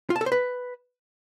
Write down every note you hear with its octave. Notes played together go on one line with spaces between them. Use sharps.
F4
A5
A4
C5
B4